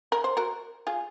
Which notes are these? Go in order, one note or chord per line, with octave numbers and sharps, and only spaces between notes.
A#4
C5
F#4 A#4
F4 G#4